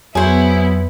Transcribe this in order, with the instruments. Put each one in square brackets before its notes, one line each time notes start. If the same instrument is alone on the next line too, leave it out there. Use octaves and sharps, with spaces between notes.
[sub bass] F2 [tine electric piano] F#3 [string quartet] B3 E4 [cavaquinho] G#4 C5